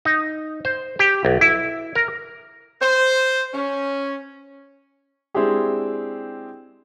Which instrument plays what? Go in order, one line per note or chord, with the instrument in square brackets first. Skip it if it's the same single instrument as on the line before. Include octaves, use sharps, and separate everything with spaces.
[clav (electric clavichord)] D#4
C5
G4
B1
E4
A#4
[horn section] C5
C#4
[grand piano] G#3 C4 D4 E4 G4 G#4